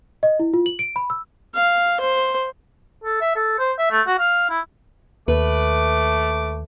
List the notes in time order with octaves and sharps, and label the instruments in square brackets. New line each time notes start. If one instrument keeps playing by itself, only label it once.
[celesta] D#5
E4
F4
F#7
D7
B5
E6
[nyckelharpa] F5
C5
[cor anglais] A4
E5
A4
C5
E5
A3
F#4
F5
E4
[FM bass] D#2 [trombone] A3 [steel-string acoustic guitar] B4 [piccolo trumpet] D6